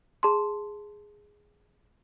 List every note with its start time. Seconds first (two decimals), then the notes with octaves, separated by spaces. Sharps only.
0.23 G#4 A5 C6